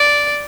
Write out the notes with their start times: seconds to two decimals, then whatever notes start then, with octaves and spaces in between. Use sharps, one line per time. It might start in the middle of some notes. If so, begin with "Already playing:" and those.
Already playing: D5